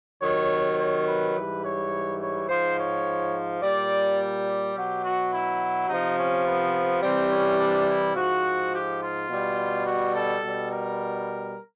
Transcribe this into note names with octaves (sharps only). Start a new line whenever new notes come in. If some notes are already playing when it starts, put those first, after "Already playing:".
C3 D#3 F#3 C#5
C#5
B4
G#2 E3 G3
C#5
C#5
G#2 F3 C5
C#5
A#2 G3 D5
G4
B2 F#3
F#4
E4
C3 F3 D#4
C#4
B3
C3 E3 G3 C4
C#4
D4
E4
G#2 F3 F#4
G4
F4
B2 G3
F#4
A4
B2
G3
A#4